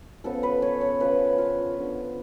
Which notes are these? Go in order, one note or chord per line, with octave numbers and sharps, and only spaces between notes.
C#3 F3 B3 A4
B4
C#5
C#5
C#3 F3 B3 B4
F4
D3 F3 B3